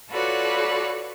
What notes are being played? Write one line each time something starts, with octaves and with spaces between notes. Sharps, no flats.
F4 F#4 A4 B4 C#5 D5